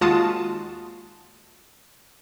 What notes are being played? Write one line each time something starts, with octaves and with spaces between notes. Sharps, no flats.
D#2 G#3 F4 F#4 A5 D#6